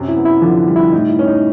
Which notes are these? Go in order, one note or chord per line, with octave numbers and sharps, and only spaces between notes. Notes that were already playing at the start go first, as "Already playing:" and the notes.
Already playing: F#2 C3
E4
B3
E4
D3 F3 F4
G3
E4
A2 D#4
E4
C#4
D#4